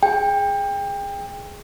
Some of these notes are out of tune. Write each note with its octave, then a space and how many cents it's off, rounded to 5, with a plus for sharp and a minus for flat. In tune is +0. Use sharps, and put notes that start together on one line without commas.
G#4 +0 G5 +25